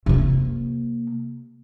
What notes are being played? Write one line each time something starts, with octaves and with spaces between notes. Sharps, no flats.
C3 A#3